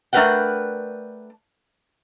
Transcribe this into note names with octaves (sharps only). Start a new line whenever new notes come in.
A3 D4 A#4 B4 F#5 G5